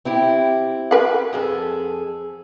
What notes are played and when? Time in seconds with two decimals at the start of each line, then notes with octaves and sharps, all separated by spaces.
0.05 C4 E4 G4
0.91 A#4 B4 F#5
1.33 F2 G#4 A4